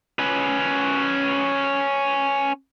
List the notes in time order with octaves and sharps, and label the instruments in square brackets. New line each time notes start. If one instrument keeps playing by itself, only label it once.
[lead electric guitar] C#4 B4